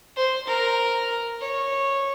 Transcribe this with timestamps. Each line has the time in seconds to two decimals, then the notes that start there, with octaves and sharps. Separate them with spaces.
0.16 C5
0.47 A#4
1.41 C#5